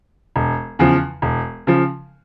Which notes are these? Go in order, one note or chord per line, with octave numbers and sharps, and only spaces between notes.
E1
E2 C#3 F3
E1
C#3 F3